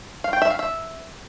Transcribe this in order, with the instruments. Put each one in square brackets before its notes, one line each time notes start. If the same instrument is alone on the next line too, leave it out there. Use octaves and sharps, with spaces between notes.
[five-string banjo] F5
G5
E5
F5
E5